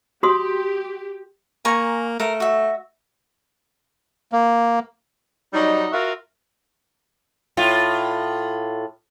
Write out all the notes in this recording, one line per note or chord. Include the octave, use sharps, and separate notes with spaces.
F#4 G4 C6 D#6
A#3 G#5 A#5 C#6
A3 A#4 F5
F#4 E5
A#3
F#3 G3 D#4
F4 F#4 A#4 E5 F5
A2 F4